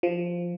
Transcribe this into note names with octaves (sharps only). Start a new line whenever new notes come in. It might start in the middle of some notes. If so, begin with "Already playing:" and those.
F3